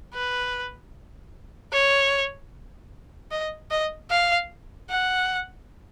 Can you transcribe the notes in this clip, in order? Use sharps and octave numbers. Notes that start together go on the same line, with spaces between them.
B4
C#5
D#5
D#5
F5
F#5